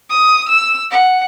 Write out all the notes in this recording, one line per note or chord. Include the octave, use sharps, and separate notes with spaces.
D#6
E6
F#5